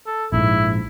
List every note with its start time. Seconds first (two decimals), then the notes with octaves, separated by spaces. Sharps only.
0.07 A4
0.33 A#1 G#2 E4